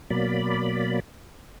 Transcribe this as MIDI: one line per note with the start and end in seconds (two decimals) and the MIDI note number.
0.10 1.00 47
0.10 1.00 54
0.10 1.00 58
0.10 1.00 74
0.10 1.00 83